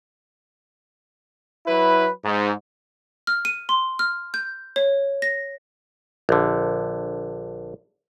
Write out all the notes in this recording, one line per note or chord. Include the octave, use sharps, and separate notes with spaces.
F#3 E4 B4
G#2
F6
D#7
C6
F6
G6
C#5
A#6
A#1 D3